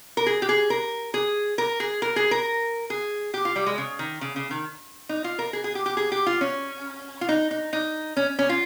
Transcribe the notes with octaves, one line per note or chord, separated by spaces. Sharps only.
A#4
G#4
G4
G#4
A#4
G#4
A#4
G#4
A#4
G#4
A#4
G#4
G4
F4
G3
G#3
C#3
D#3
C#3
C#3
D#3
D#4
F4
A#4
G#4
G#4
G4
G4
G#4
G4
F4
C#4
F4
D#4
D#4
D#4
C#4
C#4
F4